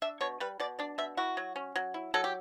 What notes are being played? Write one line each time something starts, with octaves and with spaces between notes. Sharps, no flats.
D4 E5
B2 C#5
G3 B4
B2 D5
D4 D5
B2 E5
E4 F#4
F#3
C#4
F#3
E4
F#3 A4
G4